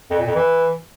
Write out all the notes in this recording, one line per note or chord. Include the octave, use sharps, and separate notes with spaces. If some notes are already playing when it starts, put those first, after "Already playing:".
F2
A#2
F2
E3